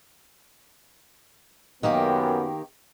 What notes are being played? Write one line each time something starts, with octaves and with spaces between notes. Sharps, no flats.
F#2 D#3 A#3 B3 G4